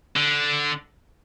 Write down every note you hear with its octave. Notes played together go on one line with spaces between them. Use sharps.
D3